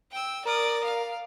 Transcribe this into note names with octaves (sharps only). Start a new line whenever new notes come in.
G5 E6
A#4 D5 D#6
F5